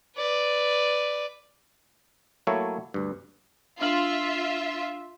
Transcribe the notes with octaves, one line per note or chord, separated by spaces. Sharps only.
B4 D5
F#3 A3 A#3 E4 A4 C#5
D2 G2
D4 F4 E5 F6 F#7